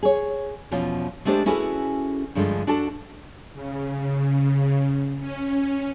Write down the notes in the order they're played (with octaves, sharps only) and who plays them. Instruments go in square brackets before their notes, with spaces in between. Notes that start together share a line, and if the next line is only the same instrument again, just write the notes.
[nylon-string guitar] G#4 C#5
E2 B2 F3 C#4 F4
G#3 A3 D4 G4 C5
C#4 E4 F#4 G#4 A4 B4
G2 D3 F3 G#3 A3
D4 F#4 A4 A5
[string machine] C#3
C#4